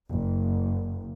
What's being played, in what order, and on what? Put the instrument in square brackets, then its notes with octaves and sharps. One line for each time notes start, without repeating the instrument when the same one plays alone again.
[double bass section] F#1